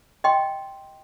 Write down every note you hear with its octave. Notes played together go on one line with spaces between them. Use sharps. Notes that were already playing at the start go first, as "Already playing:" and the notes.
D#5 G5 C6